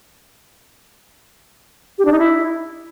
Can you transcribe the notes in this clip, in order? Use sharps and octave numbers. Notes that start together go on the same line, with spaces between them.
G4
D4
D#4
E4